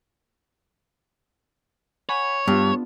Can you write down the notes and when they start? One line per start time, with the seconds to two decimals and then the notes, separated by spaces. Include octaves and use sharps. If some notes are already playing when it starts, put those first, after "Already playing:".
2.09 C#5 F#5 G#5 B5
2.48 G2 B3 D4 F4